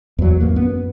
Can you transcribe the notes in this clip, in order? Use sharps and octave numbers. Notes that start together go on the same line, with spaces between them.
E2 F#3
A1 E2 A#3
F#2 B3